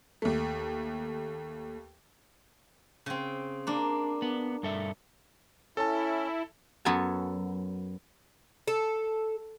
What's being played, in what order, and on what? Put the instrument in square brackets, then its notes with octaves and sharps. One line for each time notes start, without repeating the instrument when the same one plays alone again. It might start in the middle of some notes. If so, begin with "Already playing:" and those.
[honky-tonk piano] D#2 A3
[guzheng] C#3 C4
A#3 D4
[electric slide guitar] B3
G2 A4 E5
[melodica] C#4 [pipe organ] E4 [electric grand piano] A4 A5
[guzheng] F#2 F#3 B3 A4 G#5 A5
[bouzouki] A4